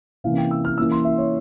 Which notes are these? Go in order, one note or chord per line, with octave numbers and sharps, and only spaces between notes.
C3 E3 A#3 C#4 F5
G5
E6
F6
E3 A#3 C#4 E6
C6
E5
C#5